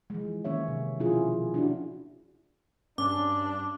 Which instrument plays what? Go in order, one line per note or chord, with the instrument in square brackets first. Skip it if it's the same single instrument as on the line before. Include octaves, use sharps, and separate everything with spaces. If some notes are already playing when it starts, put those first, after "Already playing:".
[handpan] E3 F3 G#3
D#3 A#3 C#4 C#5 E5
C3
B2 F3 C#4 E4 F4 G#4
D4 E4 F#4
[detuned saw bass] G2 [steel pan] C#4 [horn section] D4 [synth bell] D6